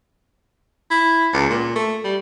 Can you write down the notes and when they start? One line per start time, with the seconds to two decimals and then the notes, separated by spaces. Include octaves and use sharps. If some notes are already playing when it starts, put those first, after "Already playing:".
0.91 E4
1.33 C#2
1.50 A#2
1.75 A3
2.04 G3